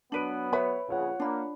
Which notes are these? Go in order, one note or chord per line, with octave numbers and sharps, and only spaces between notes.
F#3 B3 D4 B4 D7 D#7 F#7
B4 C#5 E5 B5
A#1 C#3 F4 C#5 F#5
A#3 D4 B5